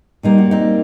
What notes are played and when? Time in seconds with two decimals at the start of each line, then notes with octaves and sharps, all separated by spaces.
0.23 A#2 G3 A#3 D#4
0.38 F#4
0.51 C4 D#4